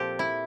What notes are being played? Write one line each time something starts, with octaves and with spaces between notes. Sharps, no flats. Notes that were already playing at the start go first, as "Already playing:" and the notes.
Already playing: A#2 F3 C4 G4 A4
E4